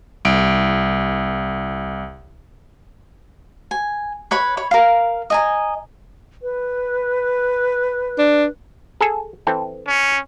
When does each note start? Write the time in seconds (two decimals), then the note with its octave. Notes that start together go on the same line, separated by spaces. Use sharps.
0.25 C2 D7
3.71 G#5
4.31 B4 C#5 B5 C#6
4.57 C#5 B5
4.71 A#4 F5
5.30 D#5 G#5 A#5
6.42 B4
8.18 D4
9.01 G#4 A4 G#5
9.47 E3 C4 A4
9.87 C#4